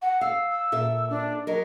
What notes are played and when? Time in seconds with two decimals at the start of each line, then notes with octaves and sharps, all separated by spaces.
0.02 F#5
0.21 F5 E6
0.51 E6
0.72 A#2 A4 E5
1.10 D4
1.47 F#3 A#4 D#5